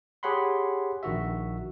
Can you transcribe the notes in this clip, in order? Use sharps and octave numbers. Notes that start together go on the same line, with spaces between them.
G4 G#4 C#5 F#5 B5 C6
A#1 D#3 F#4 E5